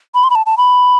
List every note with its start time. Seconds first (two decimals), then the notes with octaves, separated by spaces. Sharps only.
0.15 B5
0.24 C6
0.30 B5
0.35 A5
0.46 A5
0.58 B5